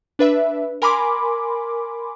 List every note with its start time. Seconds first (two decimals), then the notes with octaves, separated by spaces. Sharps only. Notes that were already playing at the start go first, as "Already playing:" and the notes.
0.19 D4 B4 E5
0.82 A#4 G#5 B5 C6 D6